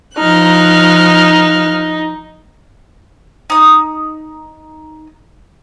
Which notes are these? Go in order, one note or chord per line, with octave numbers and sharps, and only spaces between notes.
F3 D#4 F6 F#6
D#4 D#6